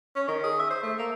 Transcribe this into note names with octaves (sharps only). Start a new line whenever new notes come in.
C#4
D#3
G#4
E5
C5
A3
A#3